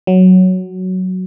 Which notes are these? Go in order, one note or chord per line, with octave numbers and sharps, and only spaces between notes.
F#3